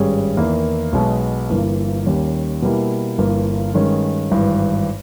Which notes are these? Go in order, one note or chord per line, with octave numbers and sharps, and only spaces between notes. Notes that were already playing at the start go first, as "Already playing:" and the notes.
Already playing: G#1 G2 G3 C#4 G#4
E2 D#3 A#3 E4
B1 B2 G#3 B3
G1 G2 E3 A#3
D#2 D#3 G3 C#4
B2 G3 A#3 E4
G1 G2 E3 A#3
G2 D#3 G#3 C#4
G#1 G2 E3